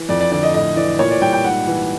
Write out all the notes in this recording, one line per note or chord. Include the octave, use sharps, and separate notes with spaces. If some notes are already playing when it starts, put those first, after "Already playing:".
Already playing: E3
F2 D5
D5
D3 D5
D#5
A2 D#5
E3 D5
A#2 C#5
D5
G3 G5
G5
G#2 F#5
E3